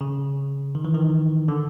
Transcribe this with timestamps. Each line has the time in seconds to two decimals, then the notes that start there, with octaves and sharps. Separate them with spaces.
0.01 C#3
0.75 D#3
0.85 E3
0.94 D#3
1.48 D3